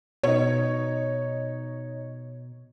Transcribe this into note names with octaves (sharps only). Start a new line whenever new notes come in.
B2 D#4 C#5